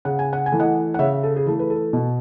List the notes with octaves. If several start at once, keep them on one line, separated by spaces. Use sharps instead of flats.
C#3 F#5
G#5
F#5
G#5
E3 A3
D#5 F#5
F#5
C#3 C#5 E5
A4
G#4
E3 A3 A4
B4
A4
B2